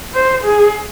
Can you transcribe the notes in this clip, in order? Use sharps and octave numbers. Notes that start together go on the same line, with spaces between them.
C5
G#4